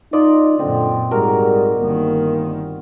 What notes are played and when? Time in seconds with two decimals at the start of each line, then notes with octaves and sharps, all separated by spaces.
0.13 D#4 F4 D5 D#5
0.59 F#2 A#2 D3 C4
1.11 G#2 G3 F#4 A#4
1.80 G1 D#3 A#3